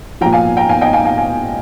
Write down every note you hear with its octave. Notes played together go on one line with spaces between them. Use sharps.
A#2 F3 G5 A#5
F5 G#5
G5 A#5
F5 G#5
D#5 G5
F5 G#5
F5 G#5
F5 G#5